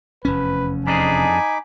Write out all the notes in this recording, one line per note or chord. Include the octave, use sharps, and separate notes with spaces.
F1 E2 C#4 B4
F2 D4 D#4 G#4 G#5 B5 D6